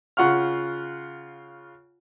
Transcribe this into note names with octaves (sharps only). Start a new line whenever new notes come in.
C#3 F4 F#5 C#6 F6